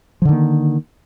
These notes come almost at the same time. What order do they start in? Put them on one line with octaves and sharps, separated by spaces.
F3 D3 D#3 A#3